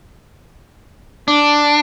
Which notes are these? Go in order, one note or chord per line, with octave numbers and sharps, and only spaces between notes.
D4